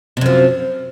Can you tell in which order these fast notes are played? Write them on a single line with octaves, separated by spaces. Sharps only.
C3 F#2 F3